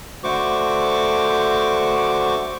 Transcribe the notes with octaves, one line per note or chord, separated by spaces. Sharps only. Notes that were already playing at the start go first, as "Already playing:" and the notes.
D3 A3 F#4 C5 C#6 D6